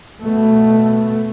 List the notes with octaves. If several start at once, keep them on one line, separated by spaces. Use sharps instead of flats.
B2 A3